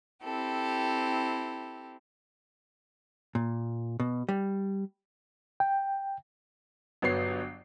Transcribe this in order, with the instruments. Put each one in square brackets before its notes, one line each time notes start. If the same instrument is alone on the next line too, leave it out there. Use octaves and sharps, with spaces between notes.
[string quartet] C4 E4 G4 A4
[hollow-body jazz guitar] A#2
B2
G3
[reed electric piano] G5
[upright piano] G1 F#3 B3 C#5 C7